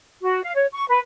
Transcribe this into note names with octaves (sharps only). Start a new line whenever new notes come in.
F#4
F5
C#5
C#6
B4